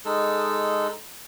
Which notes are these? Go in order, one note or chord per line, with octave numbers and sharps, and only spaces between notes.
G#3 D#4 A4